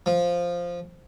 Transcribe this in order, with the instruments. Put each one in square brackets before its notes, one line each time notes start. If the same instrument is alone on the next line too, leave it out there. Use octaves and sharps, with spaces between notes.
[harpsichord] F3